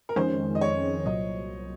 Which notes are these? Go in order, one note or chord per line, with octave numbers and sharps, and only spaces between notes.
A#4
F2 D#3 G#3 C#4 C5
D#5
C#5
C2 A#2 F#3 D#5